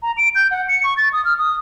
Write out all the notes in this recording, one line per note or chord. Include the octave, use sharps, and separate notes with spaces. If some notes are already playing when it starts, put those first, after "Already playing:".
A#5
D7
G6
F#5
C#7
C#6
A6
D#6
F6
D#6